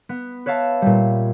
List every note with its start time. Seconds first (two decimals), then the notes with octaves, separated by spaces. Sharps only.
0.09 B3
0.46 B4 C#5 E5 F5 A5
0.82 A#2 G3